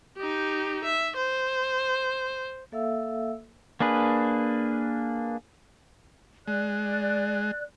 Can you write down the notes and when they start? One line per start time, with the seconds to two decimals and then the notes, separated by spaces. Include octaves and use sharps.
0.17 D#4 G4
0.85 E5
1.16 C5
2.72 A#3 A4 E5 F5 E6
3.80 A#3 D4 G#4 B4
6.48 G#3 D5 F#6